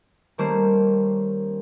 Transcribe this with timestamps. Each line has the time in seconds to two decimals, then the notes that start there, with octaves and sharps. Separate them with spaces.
0.38 D#3 G3 A3 A#3 C#4 C5